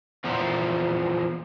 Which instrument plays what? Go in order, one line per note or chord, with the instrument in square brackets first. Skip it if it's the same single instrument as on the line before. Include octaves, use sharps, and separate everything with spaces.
[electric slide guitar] E2 A#2 F3